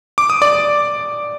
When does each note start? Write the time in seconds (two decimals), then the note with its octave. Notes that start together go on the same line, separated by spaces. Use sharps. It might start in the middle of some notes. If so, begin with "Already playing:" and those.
0.18 D6
0.30 D#6
0.42 D5 D6